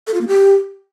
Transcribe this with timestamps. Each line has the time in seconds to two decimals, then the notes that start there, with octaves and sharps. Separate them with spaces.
0.07 A4
0.14 F4
0.21 A#3
0.28 G4